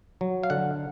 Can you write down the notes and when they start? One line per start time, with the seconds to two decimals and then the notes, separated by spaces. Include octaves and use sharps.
0.21 F#3
0.43 F5
0.50 D3 F#5